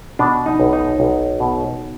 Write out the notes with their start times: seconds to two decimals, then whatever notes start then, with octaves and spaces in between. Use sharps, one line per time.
0.19 B2 D4
0.46 D#4
0.60 B1
0.73 D#4
1.00 B1
1.40 B2